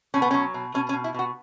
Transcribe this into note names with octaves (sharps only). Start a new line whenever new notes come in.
B2 C#4
B3
F#3 C#4
B2
B2 C#4
C#4
B2
E4
B2 F#4